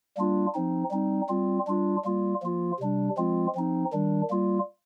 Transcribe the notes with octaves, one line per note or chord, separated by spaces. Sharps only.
G3 A#3 D4 F4
F3 C4 D#4
G3 C4 D#4
G3 C4 F4
G3 D4 F4
G3 A#3 F4
F3 A#3 F4
C3 G3 D4
F3 G#3 C4 F4
F3 C4 D#4
D#3 G3 D4
G3 A#3 F4